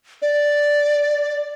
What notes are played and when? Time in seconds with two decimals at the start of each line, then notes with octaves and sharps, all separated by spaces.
0.22 D5